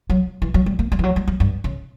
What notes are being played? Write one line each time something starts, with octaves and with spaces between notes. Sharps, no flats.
F#3
E3
F#3
G3
A#3
G3
E3
F#3
G3
F#3
G2
C#3